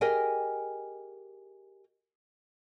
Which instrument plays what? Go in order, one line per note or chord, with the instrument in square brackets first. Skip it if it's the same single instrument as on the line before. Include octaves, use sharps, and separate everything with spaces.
[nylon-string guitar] G4 G#4 A#4 D#5 G5 G#5